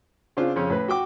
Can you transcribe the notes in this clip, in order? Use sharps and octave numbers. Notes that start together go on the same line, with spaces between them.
C#3 C4 D4 F4
F2 C#3 C#4
A2 B4
F#4 G5 D6